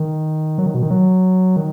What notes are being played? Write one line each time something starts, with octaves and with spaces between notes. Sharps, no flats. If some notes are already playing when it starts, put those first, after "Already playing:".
Already playing: D#3
F#3
D#3
B2
D#3
F#3
D#3